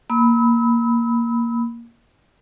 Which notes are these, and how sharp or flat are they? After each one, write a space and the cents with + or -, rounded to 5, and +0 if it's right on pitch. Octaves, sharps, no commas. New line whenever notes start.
A#3 +0 B5 +0 E6 -35